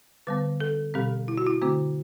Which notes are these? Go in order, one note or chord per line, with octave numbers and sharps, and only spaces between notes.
D3 G3 B3 B4
A4
B2 G3 C4 G4
E4
F#4
E4
D3 A3 C4 F#4